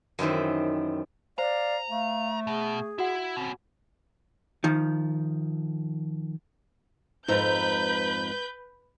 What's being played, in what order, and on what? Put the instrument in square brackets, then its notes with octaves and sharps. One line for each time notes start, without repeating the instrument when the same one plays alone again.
[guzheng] F#2 D#3 E3 C4
[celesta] C5 [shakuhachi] D5 [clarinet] F5 [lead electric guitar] A#5
[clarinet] A3 [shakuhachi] F5
[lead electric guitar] B2 [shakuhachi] G#4
[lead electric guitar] E4 [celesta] F#4 F#5
[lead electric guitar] B2 C#4 [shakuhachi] C4
[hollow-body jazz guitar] D#3 F3
[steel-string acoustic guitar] F2 G#2 A#5 [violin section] B4 G6